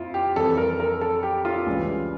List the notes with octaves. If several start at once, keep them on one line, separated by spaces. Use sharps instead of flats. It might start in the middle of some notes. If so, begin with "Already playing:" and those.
Already playing: F2 E4 F4
G4
F2 E3 G3 A4
A#4
A#4
A4
G4
F4
C#2 C#3 E3 G3